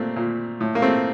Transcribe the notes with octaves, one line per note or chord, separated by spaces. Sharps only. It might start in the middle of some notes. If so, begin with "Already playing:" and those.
Already playing: A#2 A3 A#3 C4
A#2
A2
A#3
A3 C4